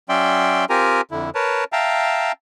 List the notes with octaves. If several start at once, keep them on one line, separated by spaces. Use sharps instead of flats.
F#3 C#4 D5 E5 G5 C6
C4 F4 G4 A#4 G#5 A#5
F2 D3 E4
A#4 B4 C#5 A5
E5 F5 G5 A5 A#5